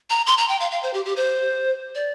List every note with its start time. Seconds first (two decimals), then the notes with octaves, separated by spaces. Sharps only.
0.10 A#5
0.27 C6
0.38 A#5
0.49 G5
0.60 F5
0.71 F5
0.83 C5
0.94 G4
1.05 G4
1.16 C5
1.95 D5